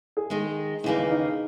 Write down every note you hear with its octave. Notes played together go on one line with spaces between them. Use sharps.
G#4
D#3 G#3 D#4
D#2 C#3 E3 A#3 E4
D#4